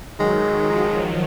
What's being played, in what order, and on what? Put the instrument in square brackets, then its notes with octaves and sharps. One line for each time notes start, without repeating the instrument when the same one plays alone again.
[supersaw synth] D#3 F#3 [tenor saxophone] G#3
[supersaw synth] F3